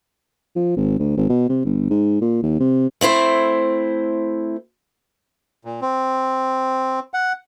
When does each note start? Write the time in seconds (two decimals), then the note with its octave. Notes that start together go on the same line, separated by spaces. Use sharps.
0.56 F3
0.77 G#1
0.99 D2
1.17 G#1
1.29 B2
1.49 C3
1.65 G1
1.90 G#2
2.21 A#2
2.43 D#2
2.60 C3
3.01 A3 C4 E4 C5
5.65 A#2
5.82 C4
7.14 F#5